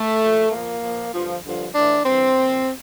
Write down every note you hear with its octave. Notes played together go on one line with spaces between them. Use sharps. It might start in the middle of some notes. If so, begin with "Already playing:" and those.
Already playing: A3
A#2 F3
A#2 F3 A#3
A#2 F3
G2 D3 F3
G2 D3 F3
A2 E3 D4
G2 E3 C4
A#2 F3